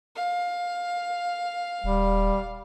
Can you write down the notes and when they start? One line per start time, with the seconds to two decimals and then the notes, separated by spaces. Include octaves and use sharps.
0.16 F5
1.84 D#1 G3